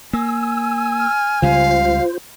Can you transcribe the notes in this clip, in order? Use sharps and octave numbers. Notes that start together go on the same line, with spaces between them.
A#3 G#5 E6
F6
C#2 C#3 G3 F4 C5 F5